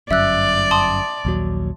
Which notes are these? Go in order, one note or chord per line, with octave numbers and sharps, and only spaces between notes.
G1 F#2 D5 E5 E6 F#6
A5 C6 D#6
A#1 D#2 F#3